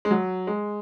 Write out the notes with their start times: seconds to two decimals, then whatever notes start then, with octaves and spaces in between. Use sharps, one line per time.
0.05 G#3
0.11 F#3
0.47 G#3